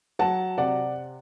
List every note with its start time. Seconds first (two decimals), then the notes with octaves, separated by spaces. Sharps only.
0.19 F#3 F#5 A5
0.58 C3 D5 F#5